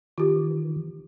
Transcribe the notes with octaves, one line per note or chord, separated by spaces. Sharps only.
D#3 E3 F4 G4